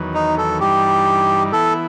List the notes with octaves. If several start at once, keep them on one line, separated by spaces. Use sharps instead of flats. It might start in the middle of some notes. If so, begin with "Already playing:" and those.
Already playing: E2 D#3 F#3 B3
D#4
A4
G2 E3 G3 D#4 G4
E3 B3 E4 A4